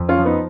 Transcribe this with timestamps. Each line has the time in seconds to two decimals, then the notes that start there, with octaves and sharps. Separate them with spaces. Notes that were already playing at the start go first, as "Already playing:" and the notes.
Already playing: F2
0.09 C#4 F4
0.18 F3
0.25 B3 D#4